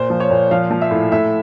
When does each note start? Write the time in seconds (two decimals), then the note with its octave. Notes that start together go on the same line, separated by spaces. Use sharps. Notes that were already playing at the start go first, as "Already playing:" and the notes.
Already playing: A#2 C5
0.10 F3
0.20 C#5
0.30 A#2
0.51 F3 F5
0.70 F3
0.81 E5
0.91 A2
1.12 A2 E5